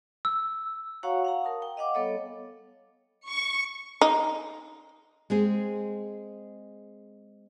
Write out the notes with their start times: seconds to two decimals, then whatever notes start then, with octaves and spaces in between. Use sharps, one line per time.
0.25 E6
1.03 F#4 C#5 F5 F#5 A#5 C#6
1.24 F5 F#5 A#5
1.43 A#4 A5 D#6
1.62 G5
1.77 D#5 F5 F#5 D6
1.94 G3 B3 A4 C#5 D#5
3.28 C#6
4.01 D#4
5.30 G#3 C4 G#4